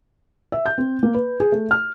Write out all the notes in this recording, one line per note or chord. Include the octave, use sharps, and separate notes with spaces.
E5
G6
C4
A#3
B4
G#4
A3
F6